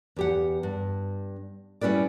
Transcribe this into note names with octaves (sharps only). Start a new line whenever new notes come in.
E2 G4 F#5
G2
G3 C#4 E4 B4 D5